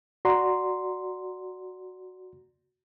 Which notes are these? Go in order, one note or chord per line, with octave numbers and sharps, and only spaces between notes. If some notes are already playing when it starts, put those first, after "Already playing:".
F#4 D5 A#5 C6